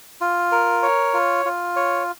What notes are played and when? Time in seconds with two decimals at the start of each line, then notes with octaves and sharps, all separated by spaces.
0.21 F4
0.52 A#4
0.83 C#5
1.14 F4
1.45 F4
1.76 C#5